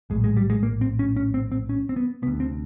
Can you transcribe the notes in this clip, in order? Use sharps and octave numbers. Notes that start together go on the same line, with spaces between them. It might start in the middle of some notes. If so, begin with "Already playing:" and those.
A#1 A2 G#3
G#3
G3
G#3
A#3
C4
C#4
C#4
C4
C4
C#4
C4
B3
D2 C3 B3
C4